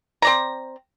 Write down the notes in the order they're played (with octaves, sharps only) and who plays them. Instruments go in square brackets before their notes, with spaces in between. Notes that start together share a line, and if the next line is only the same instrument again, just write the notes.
[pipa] C4 D5 A#5